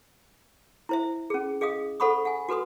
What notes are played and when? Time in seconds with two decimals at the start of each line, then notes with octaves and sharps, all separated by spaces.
0.89 E4 C5 E5
1.30 C#4 G#4
1.61 G#4 D#5 F5 D#6
2.00 A4 C5 F#5 B5 C#6 D#6
2.25 F#5 G#5
2.49 F#4 A4 B4 C6 D#6